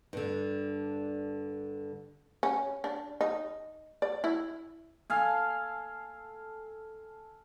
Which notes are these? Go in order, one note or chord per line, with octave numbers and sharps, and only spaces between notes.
G2 D3
C#4
D4
D#4
D5
E4
A4 F5 G#5